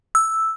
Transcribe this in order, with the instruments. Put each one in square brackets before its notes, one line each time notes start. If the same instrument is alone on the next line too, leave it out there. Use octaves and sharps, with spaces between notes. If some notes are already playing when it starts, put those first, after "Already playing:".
[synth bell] E6